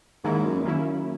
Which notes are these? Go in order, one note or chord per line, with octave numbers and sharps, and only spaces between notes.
G#2 D#3 A#3 C#4 E4
F#2
E2
F#2 D#3 A#3 C#4 E4